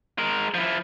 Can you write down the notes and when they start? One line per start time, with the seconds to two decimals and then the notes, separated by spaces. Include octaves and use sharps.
0.19 G#3 A#4
0.54 F3 E4